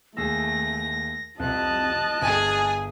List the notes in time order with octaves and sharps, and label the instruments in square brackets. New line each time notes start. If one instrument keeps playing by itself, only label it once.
[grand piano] D#2 G#4 E6 [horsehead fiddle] A3 [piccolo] A#6
[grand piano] C2 F2 [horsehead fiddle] D#5 A5 [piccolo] F#6
[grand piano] G1 [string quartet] G#4 G#5